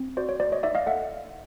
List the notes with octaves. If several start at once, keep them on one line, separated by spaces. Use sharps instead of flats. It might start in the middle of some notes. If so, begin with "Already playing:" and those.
Already playing: C4
F#4 C5 D5
C#5
F#4 C5 D5
C#5 D#5
D#4 D5 E5
D#5 F5
A4 E5 F#5